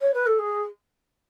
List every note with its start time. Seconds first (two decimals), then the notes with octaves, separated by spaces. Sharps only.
0.01 C#5
0.14 B4
0.27 A4
0.39 G#4